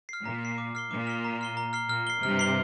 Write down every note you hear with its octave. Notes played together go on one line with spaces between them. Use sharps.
F6 C7
A#2 A#5
F6 C7
D6
F6 C7 G7
A#2 D6
F6 C7 G7
A#5
F6 C7 G7
A#5
F6 C7 G7
A#2 F6
C7 G7
G2 C3 F6
C7 G7